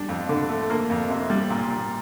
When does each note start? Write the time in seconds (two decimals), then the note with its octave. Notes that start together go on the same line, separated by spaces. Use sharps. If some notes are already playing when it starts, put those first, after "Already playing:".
Already playing: G3 D4
0.09 F2
0.29 D3
0.49 A3
0.70 A#3
0.90 F2
1.10 C3
1.30 G3
1.50 A#2
1.70 A#2